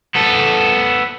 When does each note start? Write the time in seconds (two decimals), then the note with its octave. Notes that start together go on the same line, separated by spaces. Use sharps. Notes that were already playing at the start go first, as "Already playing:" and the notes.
0.15 B3 A4